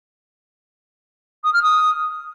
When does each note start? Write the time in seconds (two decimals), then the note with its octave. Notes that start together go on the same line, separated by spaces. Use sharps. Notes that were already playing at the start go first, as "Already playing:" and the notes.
1.44 D#6
1.53 F6
1.63 D#6